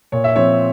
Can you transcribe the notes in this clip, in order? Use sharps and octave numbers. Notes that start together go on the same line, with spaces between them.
A#2 C#5
E5
F3 C4 C#5